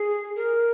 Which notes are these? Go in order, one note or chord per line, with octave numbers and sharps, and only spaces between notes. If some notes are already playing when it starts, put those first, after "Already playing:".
Already playing: G#4
A#4